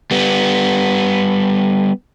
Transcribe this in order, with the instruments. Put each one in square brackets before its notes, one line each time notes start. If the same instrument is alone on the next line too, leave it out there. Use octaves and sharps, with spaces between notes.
[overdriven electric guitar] G3 B3